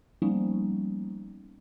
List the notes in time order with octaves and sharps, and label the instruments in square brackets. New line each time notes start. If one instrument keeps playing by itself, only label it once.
[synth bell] F3 G3 A#3 B3 C#4 D#4